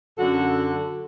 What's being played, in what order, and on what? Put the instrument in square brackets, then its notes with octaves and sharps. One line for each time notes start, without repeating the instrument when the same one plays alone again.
[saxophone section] F#2 D3 F#4 A4